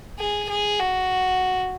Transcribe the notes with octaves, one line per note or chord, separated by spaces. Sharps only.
G#4
G#4
F#4